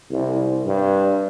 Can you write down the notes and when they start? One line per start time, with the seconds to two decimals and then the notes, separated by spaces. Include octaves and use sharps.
0.11 C2
0.66 G2